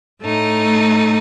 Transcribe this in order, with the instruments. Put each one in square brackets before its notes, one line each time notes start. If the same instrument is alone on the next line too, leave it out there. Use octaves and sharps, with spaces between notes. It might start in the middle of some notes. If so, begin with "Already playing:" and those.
[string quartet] A2 A3 D#4